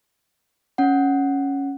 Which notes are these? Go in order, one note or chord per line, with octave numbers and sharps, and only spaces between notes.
C#4 F#5